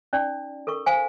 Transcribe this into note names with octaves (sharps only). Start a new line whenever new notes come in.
C#4 D#4 D5
A4 A#4 C#6
C5 F5 G#5